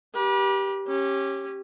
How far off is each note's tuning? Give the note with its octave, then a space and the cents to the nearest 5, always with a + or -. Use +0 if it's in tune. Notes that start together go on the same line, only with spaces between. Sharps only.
G4 +0 B4 -40
C#4 -20 G4 +0